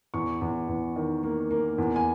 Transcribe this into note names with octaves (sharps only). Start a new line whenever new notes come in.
E2 C#6
E2
E2
D#3
A#3
A#3
E2
G#5